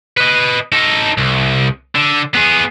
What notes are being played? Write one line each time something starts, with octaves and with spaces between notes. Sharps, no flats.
B4 D#5
D#4 A4
C2
D3
B3 G#4